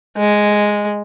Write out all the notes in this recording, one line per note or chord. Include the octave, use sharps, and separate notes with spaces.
G#3